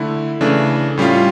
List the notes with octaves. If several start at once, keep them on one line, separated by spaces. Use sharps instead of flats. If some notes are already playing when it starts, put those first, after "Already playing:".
Already playing: D3 A3 E4
C#3 E3 A3 D4
A2 G3 C#4 F4